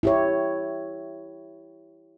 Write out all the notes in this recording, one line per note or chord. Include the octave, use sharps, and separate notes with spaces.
E4 G4 C#5